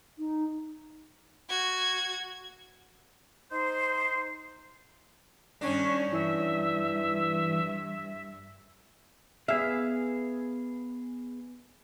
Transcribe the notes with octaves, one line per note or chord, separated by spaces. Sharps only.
D#4
F#4 G#6
D#4 C5
G2 D#3 C#4 D4
G2 E3 E5
B3 G#4 E5 F5